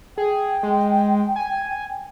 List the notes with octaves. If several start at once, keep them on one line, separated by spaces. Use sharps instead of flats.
G#4 G5
G#3
G#5